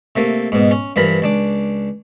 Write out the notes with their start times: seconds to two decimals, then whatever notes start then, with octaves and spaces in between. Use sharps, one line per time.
0.16 C3 A3 A#3
0.52 G#2 B2
0.71 C#4
0.96 G2 E3 F3 A#4 B5
1.22 C#2 D4 D6